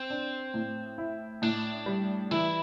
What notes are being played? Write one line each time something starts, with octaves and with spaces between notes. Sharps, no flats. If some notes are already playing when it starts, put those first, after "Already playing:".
Already playing: C4
D4
A2
E4
A2 D4
G3
E3 E4